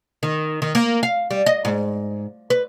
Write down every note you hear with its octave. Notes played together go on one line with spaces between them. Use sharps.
D#3
D#3
A#3
F5
G3
D#5
G#2
B4